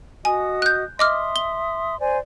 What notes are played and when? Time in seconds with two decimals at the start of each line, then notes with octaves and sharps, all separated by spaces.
0.25 F#4 D#5 G#5 D#6
0.62 F#6 G6
0.99 D#5 E5 C6 D6 D#6 F6
1.36 G7
2.00 C5 D5 G#5